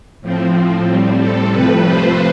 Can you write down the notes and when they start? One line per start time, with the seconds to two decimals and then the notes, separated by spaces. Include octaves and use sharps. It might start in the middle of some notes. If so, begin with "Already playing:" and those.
0.21 A2 F3 C4
0.87 A2 G3 C4
1.20 A4
1.53 C3 F3 A3 B4
1.87 C5